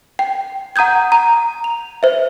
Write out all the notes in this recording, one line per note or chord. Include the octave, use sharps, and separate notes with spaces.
G5
F#5 A#5 D#6 G6 G#6
A#5
F7
C5 E5